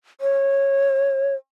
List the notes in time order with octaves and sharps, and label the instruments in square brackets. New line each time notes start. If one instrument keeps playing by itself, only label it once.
[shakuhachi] C#5